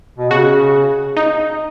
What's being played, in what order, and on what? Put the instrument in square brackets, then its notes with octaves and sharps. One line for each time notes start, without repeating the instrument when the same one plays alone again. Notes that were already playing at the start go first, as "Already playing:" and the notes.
[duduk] B2
[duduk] C#3 [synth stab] F#4
[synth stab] D#4